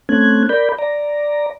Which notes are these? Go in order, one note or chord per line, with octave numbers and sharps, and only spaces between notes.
A3 C4 C#4 F#6 G#6
A#4 D5 B5 G6
D5 A#5